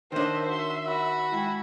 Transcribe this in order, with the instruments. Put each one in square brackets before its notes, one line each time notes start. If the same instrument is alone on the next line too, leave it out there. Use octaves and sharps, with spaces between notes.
[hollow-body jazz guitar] D#3 D4 [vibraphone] A#4 C#5 [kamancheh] C5 E5 [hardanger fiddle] D#5
[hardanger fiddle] F#4 C6 [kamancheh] E5
[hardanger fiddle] F#4 B5
[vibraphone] G#3 G5 [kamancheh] E4